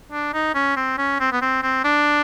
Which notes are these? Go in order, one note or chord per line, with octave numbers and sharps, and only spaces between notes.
D4
D#4
C#4
C4
C#4
C4
B3
C4
C4
D4